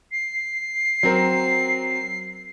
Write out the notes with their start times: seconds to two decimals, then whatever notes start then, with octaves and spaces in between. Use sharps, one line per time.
0.12 C7
1.03 F#3 C4 A#4